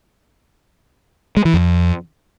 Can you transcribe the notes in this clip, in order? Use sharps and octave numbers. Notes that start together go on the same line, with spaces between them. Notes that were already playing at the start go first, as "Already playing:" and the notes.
G#3
E3
F2